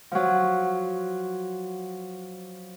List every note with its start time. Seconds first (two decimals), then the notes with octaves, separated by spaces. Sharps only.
0.12 F3 F#3